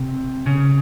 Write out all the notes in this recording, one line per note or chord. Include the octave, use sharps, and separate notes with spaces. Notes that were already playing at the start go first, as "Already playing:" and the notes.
Already playing: C3
C#3